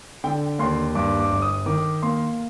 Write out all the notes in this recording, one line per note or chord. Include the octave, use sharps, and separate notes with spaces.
D3 G5
D#2 C6
G2 D6
D6
G1
D#6
D#3 D6
A#3 C6